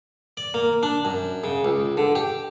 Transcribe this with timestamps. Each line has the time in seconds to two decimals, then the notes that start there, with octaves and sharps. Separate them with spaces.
0.37 D5
0.54 A#3
0.83 D4
1.05 F#2
1.44 C#3
1.65 C#2
1.97 D3
2.15 G4